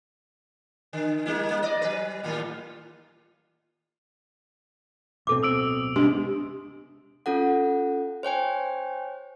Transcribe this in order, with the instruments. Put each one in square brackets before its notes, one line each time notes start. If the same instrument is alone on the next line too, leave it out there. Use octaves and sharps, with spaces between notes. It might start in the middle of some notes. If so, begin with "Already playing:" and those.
[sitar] D3
G3 A#3 E4
A#3
D5 D#5
F#3 B4
D#2 A2 F4
[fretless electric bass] D1 B2 C4 [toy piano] A4 D6
[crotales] D#6 E6 D7
[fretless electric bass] C3 G#3 B3 [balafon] D4 G4
[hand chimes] C#4 F4 A4 F#5
C5 C#5 G5 G#5